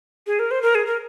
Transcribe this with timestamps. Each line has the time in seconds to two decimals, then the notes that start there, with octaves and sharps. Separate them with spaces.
0.27 G#4
0.39 A#4
0.51 C5
0.62 A#4
0.75 G#4
0.86 A#4